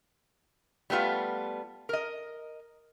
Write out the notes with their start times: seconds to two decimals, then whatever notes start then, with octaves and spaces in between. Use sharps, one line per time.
0.90 G3 A3 B3 F4
1.89 A#4 D#5